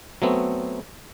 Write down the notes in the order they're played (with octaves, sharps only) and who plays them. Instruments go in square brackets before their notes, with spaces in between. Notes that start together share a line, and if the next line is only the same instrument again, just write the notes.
[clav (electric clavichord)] F#3 A3 B3 C4